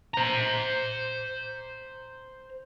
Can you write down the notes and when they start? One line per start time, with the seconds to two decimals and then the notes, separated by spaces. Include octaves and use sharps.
0.14 C5 A#5